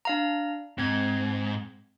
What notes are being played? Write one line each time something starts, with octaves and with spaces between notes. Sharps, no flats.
D4 F5 A#5
G#2 C4 G#6